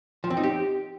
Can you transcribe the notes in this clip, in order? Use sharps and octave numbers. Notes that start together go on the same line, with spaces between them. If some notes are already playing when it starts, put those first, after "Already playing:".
F3
C4
D#4
G4